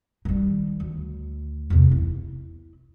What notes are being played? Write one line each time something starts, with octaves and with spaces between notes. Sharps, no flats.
D#3 G3
D2
E2 C3
E4